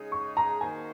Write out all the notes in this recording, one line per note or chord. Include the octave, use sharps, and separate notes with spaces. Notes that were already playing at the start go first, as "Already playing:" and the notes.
Already playing: C#3 G#3 D#4 G#4
C#6
A#5
D#3 A#3 D#4 F#4 C5 G#5